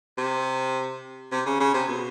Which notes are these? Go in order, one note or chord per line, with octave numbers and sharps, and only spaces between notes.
C3
C3
C#3
C#3
C3
B2